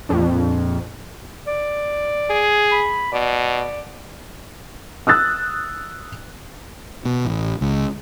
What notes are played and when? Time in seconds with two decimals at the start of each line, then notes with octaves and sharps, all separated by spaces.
0.09 A#1 F2
1.47 D5
2.30 G#4
2.72 B5
3.13 B2 D5
5.07 D#6 E6 F#6 A6
7.05 B2
7.25 A1
7.61 C#2